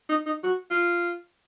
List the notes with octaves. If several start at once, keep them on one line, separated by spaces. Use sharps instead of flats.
D#4
D#4
F#4
F4